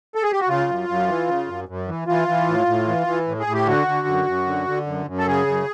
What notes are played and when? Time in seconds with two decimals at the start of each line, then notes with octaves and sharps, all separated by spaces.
0.15 A4
0.23 G#4
0.32 G4
0.41 F#4
0.49 C#3 F4
0.69 F#2
0.89 F#2
1.08 E3
1.27 C#3
1.47 F#2
1.68 F#2
1.88 E3
2.07 E3 F4
2.28 E3
2.48 A2
2.67 A2
2.88 E3
3.07 E3
3.27 A2
3.39 G#4
3.47 A2
3.54 G4
3.67 D3 F#4
3.87 D3
4.07 F#2
4.26 F#2
4.46 D3
4.67 D3
4.86 F#2
5.06 F#2
5.18 A4
5.27 C#3 G#4
5.47 F#2